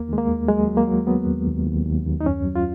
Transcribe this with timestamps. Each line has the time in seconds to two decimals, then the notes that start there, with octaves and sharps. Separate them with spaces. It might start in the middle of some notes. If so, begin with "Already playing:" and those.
Already playing: D#2 A#3
0.09 D#3 G#3
0.18 A#3
0.28 D#2
0.48 F#3 G#3
0.68 F#3
0.77 A#3
0.88 F#3
1.07 F#3 B3
1.27 D#2
1.47 D#2
1.66 D#2
1.86 D#2
2.06 D#2
2.21 D#4
2.26 F#2 C#4
2.45 F#3
2.56 F4